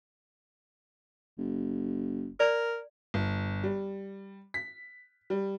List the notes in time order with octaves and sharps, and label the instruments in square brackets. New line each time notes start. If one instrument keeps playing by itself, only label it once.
[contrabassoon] F#1
[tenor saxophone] A#4 [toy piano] D5
[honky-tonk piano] G1
G3
B6
G3